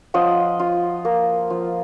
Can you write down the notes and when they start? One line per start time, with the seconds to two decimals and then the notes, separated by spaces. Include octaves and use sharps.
0.14 F3 D#5 F#5
0.60 F4
1.05 A#3
1.50 F3